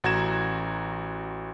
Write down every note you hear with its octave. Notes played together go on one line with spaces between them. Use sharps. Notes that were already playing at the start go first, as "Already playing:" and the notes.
A1 F#4 A#5 G#6 E7